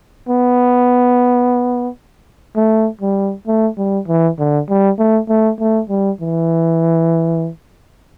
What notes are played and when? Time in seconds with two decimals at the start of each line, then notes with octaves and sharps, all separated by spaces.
0.29 B3
2.56 A3
3.01 G3
3.47 A3
3.78 G3
4.08 E3
4.39 D3
4.69 G3
4.98 A3
5.29 A3
5.60 A3
5.90 G3
6.21 E3